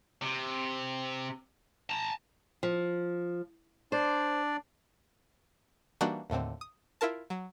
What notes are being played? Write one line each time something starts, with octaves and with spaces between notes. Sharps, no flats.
C3
A5 A#5
F3
D4 C5 D5
E3 G3 A#3 D4 D#4 F#4
D#2 A2 D3 C4
D#6
E4 F4 A#4 A5
F#3